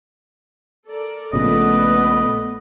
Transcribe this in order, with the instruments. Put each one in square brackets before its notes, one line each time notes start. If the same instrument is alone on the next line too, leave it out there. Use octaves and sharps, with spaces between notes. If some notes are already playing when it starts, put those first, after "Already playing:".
[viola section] A4 A#4 D5
[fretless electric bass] A#1 A#2 C#3 [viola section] A3 B4 D5 [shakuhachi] B3 [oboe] D#5